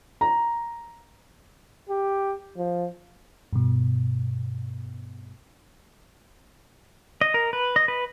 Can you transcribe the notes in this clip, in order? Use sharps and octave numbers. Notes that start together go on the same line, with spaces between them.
A#5
G4
F3
G2 B2
D#5
A#4
B4
D#5
B4